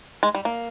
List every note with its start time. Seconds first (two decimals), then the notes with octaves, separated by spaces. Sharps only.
0.23 G#3
0.35 G3
0.45 A#3